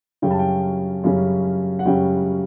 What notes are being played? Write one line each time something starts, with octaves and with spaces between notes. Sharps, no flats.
F#2 C#3 G3 C#4 G5
A5
G5
F#2 C#3 G3 C#4
F#5
F#2 C#3 G3 C#4 G5